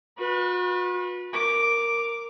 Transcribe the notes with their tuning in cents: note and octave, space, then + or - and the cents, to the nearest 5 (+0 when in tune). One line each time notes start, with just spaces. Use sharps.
F#4 -45 B4 -20
A#4 -5 D6 +0